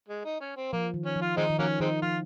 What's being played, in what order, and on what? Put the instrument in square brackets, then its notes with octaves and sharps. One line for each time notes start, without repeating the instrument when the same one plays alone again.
[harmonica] G#3
D#4
C#4
C4
[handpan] F3 [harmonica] A#3
[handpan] D#3
[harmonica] C#4
[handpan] F3
[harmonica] F4
[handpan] D#3 [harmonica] G#3 C4 D#4
[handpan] D#3
[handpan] F3 [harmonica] F#3 A#3 C#4
[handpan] D#3 [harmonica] G#3 C4 D#4
[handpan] F3 [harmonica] F4